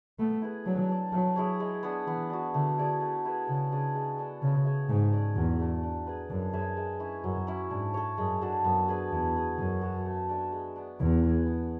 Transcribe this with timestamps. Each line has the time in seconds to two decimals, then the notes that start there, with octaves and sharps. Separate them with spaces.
0.19 A3 B3
0.42 E4 G#4 B4
0.65 F#3 D4
0.89 A4 D5
1.12 F#3 A3
1.36 E4 G#4 C#5
1.60 G#3
1.83 B3 D4 G#4
2.07 E3 B3
2.30 D4 F#4
2.54 D3 A3
2.78 E4 G#4 D5
3.00 A3
3.25 E4 G#4 B4
3.47 C#3 B3
3.72 D4 G#4 D5
3.95 G#3
4.18 B3 D4 A4
4.41 C#3 C#4
4.65 G#4 C#5 E5
4.89 G#2 A3
5.12 C#4 G#4 D5
5.36 E2 F#3
5.60 A3 D4
5.83 D4
6.07 G#4 B4
6.30 F#2 D4
6.53 G#4 B4 E5
6.77 G#3
7.00 C#4 E4
7.24 F#2 F#3
7.47 C#4 E4
7.70 G#2 D4
7.94 A4 C#5
8.18 F#2 G#3
8.42 D4 F#4 A4
8.65 F#2 B3
8.88 D4 G#4 B4
9.12 E2 E4
9.36 G#4 B4
9.58 F#2 C#4
9.82 F#4 A4 C#5
10.06 A3
10.29 D4 A4 E5
10.52 G#3
10.76 B3 D4
10.99 E2 E4
11.23 G#4 B4
11.46 B3